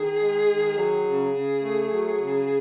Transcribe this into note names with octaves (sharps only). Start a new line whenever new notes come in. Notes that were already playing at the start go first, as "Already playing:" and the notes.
Already playing: D#3 G#4
G#3
D#3
F#3 G#4
C#3
C#3
A3
F#3
C#3